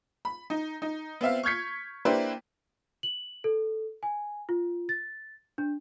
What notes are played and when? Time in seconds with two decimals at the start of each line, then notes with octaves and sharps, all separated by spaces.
0.25 B5
0.50 D#4
0.82 D#4
1.21 B3 C4 E5 F5
1.43 C#6 F6 G6 G#6 B6 C#7
2.05 A#3 D4 E4 G4 B4 C5
3.03 F#7
3.44 A4
4.03 G#5
4.49 F4
4.89 A6
5.58 D4